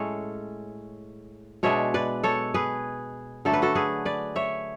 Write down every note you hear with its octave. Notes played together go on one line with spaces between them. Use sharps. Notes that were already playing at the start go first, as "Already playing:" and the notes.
Already playing: A2 G#3 C#4 A4 C#5
B2 G#3 D4 C#5 E5
B4 D5
A4 C#5
G#4 B4
D3 F#3 A3 D4 A4
B4
F#4 A4
G#4 B4
B4 D5
C#5 E5